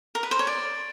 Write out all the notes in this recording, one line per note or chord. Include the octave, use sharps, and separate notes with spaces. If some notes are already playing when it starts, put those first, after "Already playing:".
A#4
B4
C5
C#5
D5